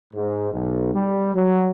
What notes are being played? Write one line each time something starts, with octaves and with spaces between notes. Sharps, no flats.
G#2
B1
G3
F#3